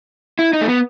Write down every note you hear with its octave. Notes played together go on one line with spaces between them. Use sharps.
E4
D#4
A3
B3